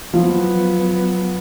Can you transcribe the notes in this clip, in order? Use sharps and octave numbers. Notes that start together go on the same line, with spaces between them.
F3 F#3 B3